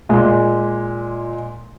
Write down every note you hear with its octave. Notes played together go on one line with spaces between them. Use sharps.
A#2 G#3